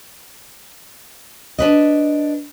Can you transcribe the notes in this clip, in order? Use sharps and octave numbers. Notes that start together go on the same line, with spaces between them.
D4 B4 D#5